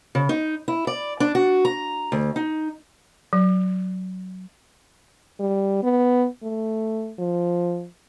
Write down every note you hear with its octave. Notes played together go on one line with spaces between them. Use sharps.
C#3
D#4
E4
D5
D4
F#4
A#5
D2
D#4
F#3
G3
B3
A3
F3